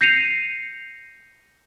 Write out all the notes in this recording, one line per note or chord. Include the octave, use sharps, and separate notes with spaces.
G6 A#6 C7 C#7 D#7 F7